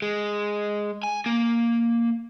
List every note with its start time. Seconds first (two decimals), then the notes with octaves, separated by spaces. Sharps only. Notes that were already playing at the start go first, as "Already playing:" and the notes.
0.02 G#3
1.03 G#5
1.26 A#3